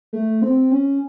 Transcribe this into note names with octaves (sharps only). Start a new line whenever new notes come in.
A3
C4
C#4